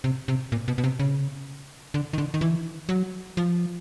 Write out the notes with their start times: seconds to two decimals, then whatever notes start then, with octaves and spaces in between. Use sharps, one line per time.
0.04 C3
0.28 C3
0.52 A#2
0.68 B2
0.78 B2
0.84 C3
0.99 C#3
1.94 D3
2.13 D#3
2.18 D3
2.34 D#3
2.41 E3
2.89 F#3
3.37 F3